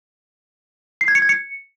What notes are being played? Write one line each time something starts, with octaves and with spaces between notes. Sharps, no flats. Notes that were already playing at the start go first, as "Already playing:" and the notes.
C7
G#6
C#7
G#6
C#7